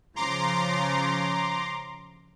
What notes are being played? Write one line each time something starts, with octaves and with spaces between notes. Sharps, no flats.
C#3 F3 A#5 C6 D6